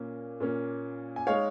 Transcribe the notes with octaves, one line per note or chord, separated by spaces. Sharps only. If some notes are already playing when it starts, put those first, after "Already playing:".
Already playing: A#2 A#3 C#4
A#2 A#3 C#4
G#5
G#3 D#4 C#5 F5